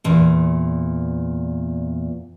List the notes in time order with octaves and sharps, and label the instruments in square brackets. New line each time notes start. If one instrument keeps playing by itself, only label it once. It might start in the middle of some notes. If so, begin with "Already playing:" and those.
[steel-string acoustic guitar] E2 A#2